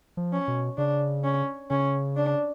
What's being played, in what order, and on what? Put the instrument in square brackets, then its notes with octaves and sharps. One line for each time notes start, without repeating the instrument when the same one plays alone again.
[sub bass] F3
[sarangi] C#4
[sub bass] B2
[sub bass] C#3 [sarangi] D4
[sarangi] C#4
[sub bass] C#3 [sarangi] C#4
[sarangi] D4